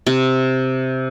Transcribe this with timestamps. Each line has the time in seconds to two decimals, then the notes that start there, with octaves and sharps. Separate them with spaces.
0.07 C3